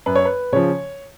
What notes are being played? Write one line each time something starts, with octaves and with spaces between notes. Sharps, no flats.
F#2 B4
C#5
B4
C#3 F3 C#5